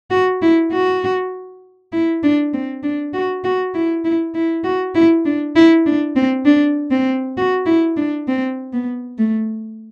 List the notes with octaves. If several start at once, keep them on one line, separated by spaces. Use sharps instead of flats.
F#4
E4
F#4
E4
D4
C4
D4
F#4
F#4
E4
E4
E4
F#4
E4
D4
E4
D4
C4
D4
C4
F#4
E4
D4
C4
B3
A3